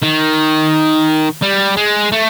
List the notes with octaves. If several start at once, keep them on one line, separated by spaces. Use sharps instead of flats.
D#3
G3
G#3
A3